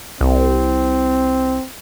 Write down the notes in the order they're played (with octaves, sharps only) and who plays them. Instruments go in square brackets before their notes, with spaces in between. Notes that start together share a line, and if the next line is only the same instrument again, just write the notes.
[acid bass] C2 [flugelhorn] C4